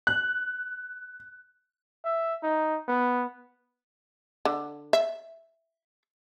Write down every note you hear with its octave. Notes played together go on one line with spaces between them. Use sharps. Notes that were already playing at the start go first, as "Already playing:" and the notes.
F#6
E5
D#4
B3
D3
E5